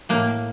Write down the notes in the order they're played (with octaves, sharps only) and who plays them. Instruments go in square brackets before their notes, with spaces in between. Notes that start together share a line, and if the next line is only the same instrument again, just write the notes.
[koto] A2 A#3